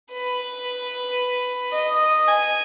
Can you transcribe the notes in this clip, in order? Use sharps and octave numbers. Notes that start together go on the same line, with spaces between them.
B4
D#5
G#5